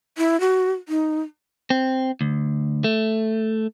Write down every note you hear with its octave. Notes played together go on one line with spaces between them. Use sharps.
E4
F#4
D#4
C4
D2
A3